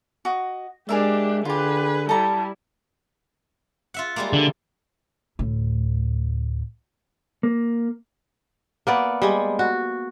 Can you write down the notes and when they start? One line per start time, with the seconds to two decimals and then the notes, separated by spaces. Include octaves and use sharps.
0.25 F#4 D#5
0.89 G#3 D4 G4 G#4 A#4 E5
1.45 D3 F4 G4 G#4 B4
2.09 G3 E4 A4 A#5
3.94 F4 E5 F#5
4.16 G3 G#3 A#3
4.33 D3
5.39 D2 A2
7.43 A#3
8.87 A#3 B3 D5
9.22 G3 G#3
9.59 F#4